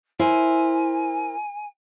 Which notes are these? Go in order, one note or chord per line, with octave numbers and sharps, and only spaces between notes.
E4 A#4 C5 G#5